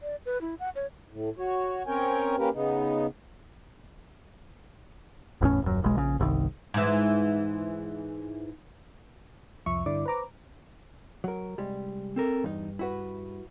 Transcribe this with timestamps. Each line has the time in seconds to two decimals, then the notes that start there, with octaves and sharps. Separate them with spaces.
0.01 D5
0.26 B4
0.41 E4
0.60 F#5
0.75 C#5
1.11 A2
1.38 F#4 C#5
1.87 C4 C#4 A#4 C#5 G5 G#5
2.38 A#3 C#4 G4 A#4 B4
2.53 C#3 B3 D#4
5.41 G1 E2 A2 C#4
5.62 D#1 F#2
5.82 E1 B1 G#3
5.96 A#1 C#3
6.19 G1 C2 C3 D#3
6.74 G#2 E3
9.66 C2 F2 F3 E5 C#6
9.86 G2 D3 E4 D5 D6
10.06 B4 C5 A#5 D6
11.24 F#3 A#4
11.58 C2 G3 G#3
12.16 C4 A4 A#4
12.44 E2 G2 D#4
12.79 E4 F#4 B4